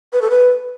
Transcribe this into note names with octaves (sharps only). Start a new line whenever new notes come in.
B4
A4
B4